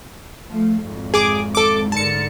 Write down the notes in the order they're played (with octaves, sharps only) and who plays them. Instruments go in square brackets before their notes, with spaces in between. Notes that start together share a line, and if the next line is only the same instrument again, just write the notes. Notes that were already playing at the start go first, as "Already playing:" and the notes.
[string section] F3 A3
G#1 F2
[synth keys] G#4 D6
A4 D6
[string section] G#2 D3 A#4 [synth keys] A5 C#7